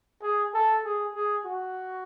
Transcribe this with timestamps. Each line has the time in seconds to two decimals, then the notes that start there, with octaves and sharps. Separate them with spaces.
0.22 G#4
0.54 A4
0.85 G#4
1.15 G#4
1.46 F#4